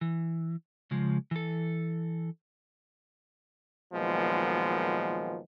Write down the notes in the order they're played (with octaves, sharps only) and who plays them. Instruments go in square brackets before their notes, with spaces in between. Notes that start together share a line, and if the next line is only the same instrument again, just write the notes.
[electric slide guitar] E3
C#3 F3 G#3
E3 A4
[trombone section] A#2 D#3 F3 F#3 G#3 B3